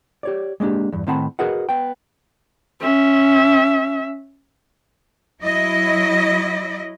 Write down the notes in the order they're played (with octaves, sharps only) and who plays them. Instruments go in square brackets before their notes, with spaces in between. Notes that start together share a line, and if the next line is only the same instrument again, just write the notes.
[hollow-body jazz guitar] G4 C#5 D5
G#3 A#3 C#4 D4 G4
E2 G2
A2 D#3 C4 F#5 A5 B5
F#4 G#4 A#4 B4 D#5 F#5
B3 G5
[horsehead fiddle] C#4 E5
[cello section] F#3 E4 D#5